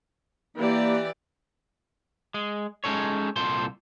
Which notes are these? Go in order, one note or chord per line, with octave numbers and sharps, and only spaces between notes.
E3 A#3 G4 D5
G#3
G#3 C#4 D#4 A4 C#5
C2 A#2 A4 C5 C6